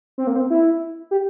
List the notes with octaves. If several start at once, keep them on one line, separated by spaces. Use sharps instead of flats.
C4
A#3
C4
E4
G4